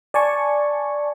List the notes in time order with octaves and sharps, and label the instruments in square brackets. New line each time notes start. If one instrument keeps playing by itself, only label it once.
[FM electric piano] D5 G#5 A5 C#6